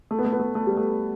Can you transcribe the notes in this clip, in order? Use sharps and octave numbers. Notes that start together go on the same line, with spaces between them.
A3
B3
A3
B3
A3
A3
G3
A3